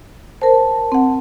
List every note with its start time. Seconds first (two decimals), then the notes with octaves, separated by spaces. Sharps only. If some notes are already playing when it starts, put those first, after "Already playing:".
0.42 A#4 C5 A5
0.92 C4 F#5